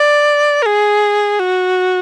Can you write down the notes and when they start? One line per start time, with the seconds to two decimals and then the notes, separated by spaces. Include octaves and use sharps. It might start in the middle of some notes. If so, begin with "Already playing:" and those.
Already playing: D5
0.62 A#4
0.66 G#4
1.40 F#4